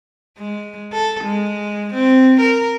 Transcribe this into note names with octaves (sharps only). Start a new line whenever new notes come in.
G#3
A4
G#3
C4
A#4